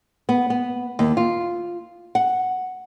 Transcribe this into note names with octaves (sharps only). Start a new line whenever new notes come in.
B3
B3
D#2
F4
F#5